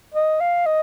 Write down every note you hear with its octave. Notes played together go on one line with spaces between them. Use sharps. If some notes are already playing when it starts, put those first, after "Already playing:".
D#5
F5
D#5